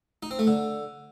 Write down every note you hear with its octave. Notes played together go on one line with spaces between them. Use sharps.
D#4
C4
A3
D3